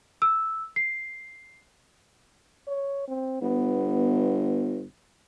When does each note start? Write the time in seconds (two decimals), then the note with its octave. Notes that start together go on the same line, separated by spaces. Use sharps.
0.22 E6
0.76 C7
2.68 C#5
3.08 C4
3.42 G1 B3